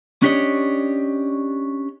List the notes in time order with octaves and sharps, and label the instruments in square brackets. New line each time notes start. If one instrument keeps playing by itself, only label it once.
[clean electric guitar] C#4 D4 G4 C#5 D#5